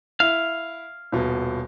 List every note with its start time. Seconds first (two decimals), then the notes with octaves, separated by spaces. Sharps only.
0.20 E4 F5
1.12 D#1 B2